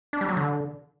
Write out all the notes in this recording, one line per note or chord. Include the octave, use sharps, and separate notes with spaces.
D4
G3
F#3
D3